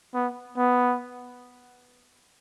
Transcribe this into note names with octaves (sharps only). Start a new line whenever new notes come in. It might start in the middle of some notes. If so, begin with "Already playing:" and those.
B3
B3